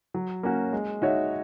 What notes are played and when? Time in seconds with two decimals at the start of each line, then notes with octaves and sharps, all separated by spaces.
0.14 F#3
0.43 A#3 C#4 F#4
0.73 G#3
1.02 D#4 F#4 C#5 E5